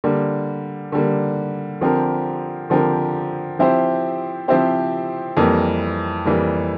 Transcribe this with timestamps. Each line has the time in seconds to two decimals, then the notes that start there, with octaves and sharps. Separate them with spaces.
0.04 D3 G3 A#3
0.92 D3 G3 A#3
1.81 D3 F3 C4 G4 A#4
2.70 D3 F3 C4 G4 A#4
3.59 F3 C4 E4 G4 C5
4.48 F3 C4 E4 G4 C5
5.37 F2 E3 G3 A#3
6.25 F2 E3 G3 A#3